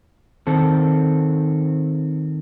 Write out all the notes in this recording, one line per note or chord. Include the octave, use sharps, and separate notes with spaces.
D#3 C4 A4